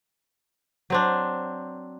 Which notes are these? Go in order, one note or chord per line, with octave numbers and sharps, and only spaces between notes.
F#3 C4 D4